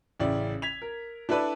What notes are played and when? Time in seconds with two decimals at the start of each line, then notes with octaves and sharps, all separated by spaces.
0.20 A1 C#3 E4 D5
0.62 G#6 B6 F7
0.82 A#4
1.29 D4 E4 A4 B4 D5